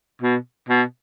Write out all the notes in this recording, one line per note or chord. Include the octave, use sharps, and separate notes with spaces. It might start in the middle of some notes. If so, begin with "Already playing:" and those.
B2
B2